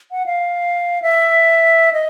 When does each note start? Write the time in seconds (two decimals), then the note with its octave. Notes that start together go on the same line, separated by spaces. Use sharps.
0.12 F#5
0.26 F5
1.02 E5
1.93 D#5